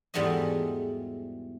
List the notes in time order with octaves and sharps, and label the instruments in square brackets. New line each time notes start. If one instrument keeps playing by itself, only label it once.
[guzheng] E2 G#2 G3 A3 F#4 D#5